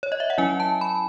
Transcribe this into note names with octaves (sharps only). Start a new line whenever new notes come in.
C#5
D#5
E5
F#5
F#3 C#4 E4 G#5
A5
B5